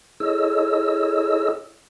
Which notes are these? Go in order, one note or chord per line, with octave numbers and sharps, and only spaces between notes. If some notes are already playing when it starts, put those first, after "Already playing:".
E4 G#4 A4 C#5 D#5 E6